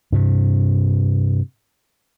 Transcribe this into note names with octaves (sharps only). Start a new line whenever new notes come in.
G2 C3